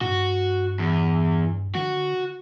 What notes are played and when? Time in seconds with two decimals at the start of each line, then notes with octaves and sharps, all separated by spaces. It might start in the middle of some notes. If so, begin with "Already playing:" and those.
0.01 G2 F#4
0.79 E2
1.75 D3 F#4